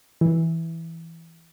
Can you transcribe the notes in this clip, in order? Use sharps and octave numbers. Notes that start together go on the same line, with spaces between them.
E3